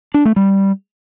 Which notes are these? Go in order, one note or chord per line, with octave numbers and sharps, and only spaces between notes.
D4
A3
G3